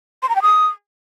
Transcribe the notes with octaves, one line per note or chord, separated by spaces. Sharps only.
C6
A#5
G5
D#6